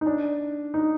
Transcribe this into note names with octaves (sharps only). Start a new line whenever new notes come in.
D#4
D4
D#4